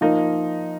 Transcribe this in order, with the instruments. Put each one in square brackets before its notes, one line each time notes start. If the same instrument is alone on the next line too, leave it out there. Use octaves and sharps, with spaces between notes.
[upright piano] F3 A#3 D#4